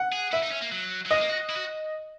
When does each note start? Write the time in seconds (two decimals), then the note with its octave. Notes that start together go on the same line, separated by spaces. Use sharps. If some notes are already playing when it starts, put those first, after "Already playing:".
Already playing: F#5
0.13 G#4
0.32 E4 E5
0.43 D#4
0.52 C#4
0.61 A#3
0.72 F#3
1.06 F#3
1.11 G#3 D#5
1.20 A#3
1.29 F#4
1.49 E4
1.56 F#4